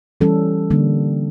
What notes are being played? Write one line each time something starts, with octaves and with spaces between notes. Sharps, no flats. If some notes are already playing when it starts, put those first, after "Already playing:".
E3 G3 C#4 A4
D3 G3 A#3 D4